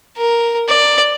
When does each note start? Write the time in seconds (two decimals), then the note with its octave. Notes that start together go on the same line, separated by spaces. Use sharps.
0.17 A#4
0.68 D5